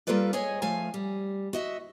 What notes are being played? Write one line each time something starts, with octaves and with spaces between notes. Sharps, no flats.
G3 A#3 F4 A4 B4 D5
G#4 C#5 D#5 G#5
F3 A3 F5 G#5
G3
F#4 D#5 E5